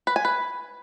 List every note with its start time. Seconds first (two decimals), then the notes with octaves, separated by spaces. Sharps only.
0.07 B4
0.16 G#5
0.25 B4